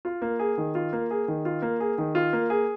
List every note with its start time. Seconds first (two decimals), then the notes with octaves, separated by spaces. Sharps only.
0.05 F4
0.22 A#3
0.39 G#4
0.58 D#3
0.75 F4
0.93 A#3
1.11 G#4
1.28 D#3
1.45 F4
1.62 A#3
1.80 G#4
1.98 D#3
2.15 F4
2.33 A#3
2.50 G#4